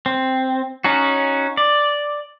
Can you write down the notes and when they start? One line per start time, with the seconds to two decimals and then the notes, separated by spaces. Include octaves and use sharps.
0.06 C4
0.84 C#4 D#4 F#4
1.57 D5